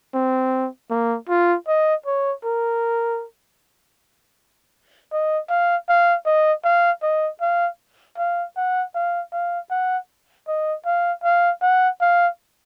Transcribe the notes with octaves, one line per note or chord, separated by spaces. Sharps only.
C4
A#3
F4
D#5
C#5
A#4
D#5
F5
F5
D#5
F5
D#5
F5
F5
F#5
F5
F5
F#5
D#5
F5
F5
F#5
F5